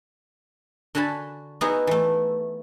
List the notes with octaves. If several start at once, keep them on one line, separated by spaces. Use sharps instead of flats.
D3 F#4 G#5 A5 B5
B3 D#4 E4 F#4 G#4
E3 A3